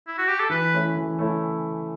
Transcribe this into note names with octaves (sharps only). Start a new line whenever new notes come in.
E4
F#4
G4
A4
E3 B4
A3 C#4 E4
E3
A3 C#4 E4